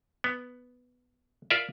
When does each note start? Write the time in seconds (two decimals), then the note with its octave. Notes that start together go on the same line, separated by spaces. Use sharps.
0.24 B3
1.50 F4 A#4 D5 E5